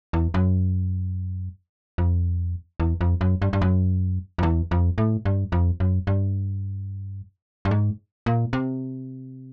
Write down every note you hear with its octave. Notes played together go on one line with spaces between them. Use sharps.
E2
F#2
F2
E2
F2
F#2
G2
G2
F#2
F2
E2
F2
A2
G2
F2
F#2
G2
G2
G#2
A#2
C3